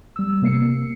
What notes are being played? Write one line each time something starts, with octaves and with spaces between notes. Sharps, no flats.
G3 E6
C3 A#3 C7 C#7